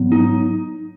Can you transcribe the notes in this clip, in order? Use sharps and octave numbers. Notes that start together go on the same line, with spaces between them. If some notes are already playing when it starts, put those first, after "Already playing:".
Already playing: G#2 F#3 B3
D#4